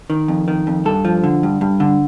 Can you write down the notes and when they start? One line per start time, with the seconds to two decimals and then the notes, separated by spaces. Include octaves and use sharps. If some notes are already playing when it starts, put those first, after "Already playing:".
0.10 D#3
0.28 F2
0.48 D#3
0.67 F2
0.85 G2 A4
1.05 F3
1.24 D3
1.43 G2
1.61 G2
1.80 D3